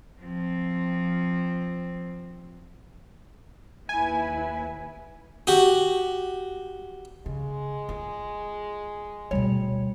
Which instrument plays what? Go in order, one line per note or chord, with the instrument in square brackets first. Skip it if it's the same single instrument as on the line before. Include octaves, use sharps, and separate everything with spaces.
[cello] F3 C4
[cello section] D#2 E4 B4 [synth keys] G#5
[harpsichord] F#4 G4
[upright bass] C#3 [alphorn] G#3
[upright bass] F4
[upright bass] D2 B2 [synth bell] G3 C#5